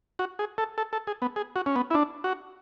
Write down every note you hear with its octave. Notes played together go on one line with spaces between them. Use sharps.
F#4
G#4
A4
A4
A4
G#4
B3
G#4
F#4
C#4
B3
E4
D4
F#4